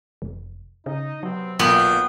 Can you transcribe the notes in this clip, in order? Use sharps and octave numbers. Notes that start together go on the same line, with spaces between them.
F1
C#3 D#4 D#5
C3 F#3 B3 C4
B1 A#2 B3 F5 G5